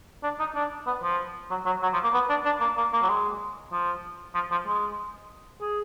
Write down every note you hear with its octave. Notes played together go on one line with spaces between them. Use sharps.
D4
D#4
D4
B3
F3
F#3
F#3
F#3
F3
A#3
B3
D4
D4
A#3
A#3
A#3
F#3
G#3
F3
F3
F3
G#3
G#4